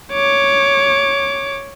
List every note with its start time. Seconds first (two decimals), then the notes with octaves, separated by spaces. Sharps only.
0.13 C#5 D6